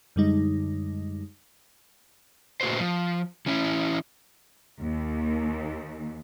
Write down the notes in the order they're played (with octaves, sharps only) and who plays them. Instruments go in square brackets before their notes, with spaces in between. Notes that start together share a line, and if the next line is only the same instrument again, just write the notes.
[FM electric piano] F#2 D3 G3 G#3 D#4
[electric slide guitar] A#2 A3 F#4 B4 C5
F3
E3 C#4 E4
[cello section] D#2